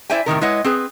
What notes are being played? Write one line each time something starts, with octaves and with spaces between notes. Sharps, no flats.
E4 C5 D5 E5 G5 G#5
A2 C3 D#3 A#4
G#3 E4 B4 C#5 D#5 F#5
C4 G#4 B4